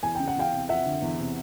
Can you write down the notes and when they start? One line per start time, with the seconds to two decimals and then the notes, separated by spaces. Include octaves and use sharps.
0.03 E2 G#5
0.15 C#3 G5
0.28 F#5
0.36 E2 F5 G5
0.52 C3
0.69 F2 E5 F#5
0.86 D3
1.02 E2
1.19 C3